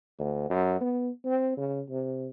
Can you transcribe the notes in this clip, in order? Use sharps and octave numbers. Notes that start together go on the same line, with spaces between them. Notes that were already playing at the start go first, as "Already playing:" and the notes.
D2
F#2
B3
C4
C#3
C3